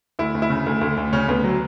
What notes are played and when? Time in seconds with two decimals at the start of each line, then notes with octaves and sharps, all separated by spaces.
0.19 D2 E4
0.35 D2
0.42 E4
0.50 C#3
0.66 D2
0.81 D2
0.97 D2
1.13 C#3 C#4
1.28 D2 B3
1.44 F#3